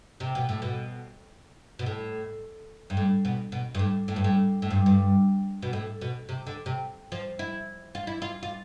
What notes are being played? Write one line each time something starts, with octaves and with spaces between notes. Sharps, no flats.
C3
B2
A2
B2
B2
A2
G2
A2
B2
B2
G2
A2
A2
G2
A2
A2
G2
G2
B2
A2
B2
C3
D3
C3
F3
E4
F4
E4
F4
F4